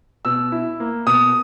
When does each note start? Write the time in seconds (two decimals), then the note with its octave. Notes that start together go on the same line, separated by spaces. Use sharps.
0.25 B2 E6
0.52 E4
0.80 A#3
1.06 B2 D#6